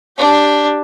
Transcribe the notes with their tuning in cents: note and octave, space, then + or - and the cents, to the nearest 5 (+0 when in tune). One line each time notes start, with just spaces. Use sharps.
D4 +0 G4 +0